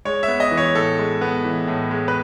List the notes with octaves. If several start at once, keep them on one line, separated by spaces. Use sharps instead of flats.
G#3 C#5
E5
B3
D#5
E3
C#5
A2 A4
G#3
B3
E3
A2
G#3
B4